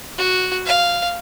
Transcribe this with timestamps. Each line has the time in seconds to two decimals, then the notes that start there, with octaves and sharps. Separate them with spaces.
0.18 F#4
0.66 F5